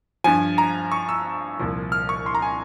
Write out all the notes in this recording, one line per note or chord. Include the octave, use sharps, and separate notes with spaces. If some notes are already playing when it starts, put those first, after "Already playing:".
G2 F3 G#5
A#5
C#6
E6
C2 A#2 F3
F6
C#6
C6
A#5
G#5